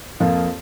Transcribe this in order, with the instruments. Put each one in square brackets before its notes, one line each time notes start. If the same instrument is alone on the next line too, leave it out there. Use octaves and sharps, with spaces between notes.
[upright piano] F2 F3 A#3 F4